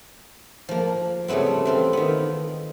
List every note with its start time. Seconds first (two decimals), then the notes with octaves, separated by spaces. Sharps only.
0.69 F3 A#3
1.28 C#3 G3 A3 B3 C4
1.65 E3 C4 F4
1.93 D#3 B3